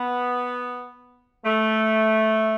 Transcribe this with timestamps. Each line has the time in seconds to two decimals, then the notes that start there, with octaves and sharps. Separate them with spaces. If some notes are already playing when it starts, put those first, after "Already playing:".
Already playing: B3
1.46 A3